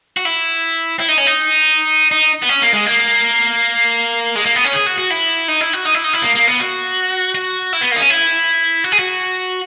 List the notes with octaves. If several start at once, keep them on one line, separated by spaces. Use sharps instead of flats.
F#4
E4
E4
D#4
C#4
D#4
D#4
B3
C#4
A#3
G#3
A#3
G#3
A#3
B3
C#4
G#4
F#4
F#4
E4
D#4
E4
F#4
D#4
E4
D#4
E4
A#3
A#3
B3
F#4
F#4
E4
B3
A#3 D#4
C#4
E4
F#4
G#4
F#4